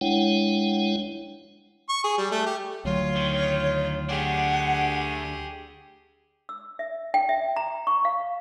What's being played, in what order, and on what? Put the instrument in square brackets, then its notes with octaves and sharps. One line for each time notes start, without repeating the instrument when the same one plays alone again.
[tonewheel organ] G#3 D4 E4 C#5 F#5 G5
[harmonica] C#6
G#4
G3
A3
G4
[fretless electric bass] D2 F#3 [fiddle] F4 [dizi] C#5
[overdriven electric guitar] D#3
[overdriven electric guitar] A3 D4 [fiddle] G4 G#4 [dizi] F#5
[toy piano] E6
E5
G5
E5
A#5
C#6
F5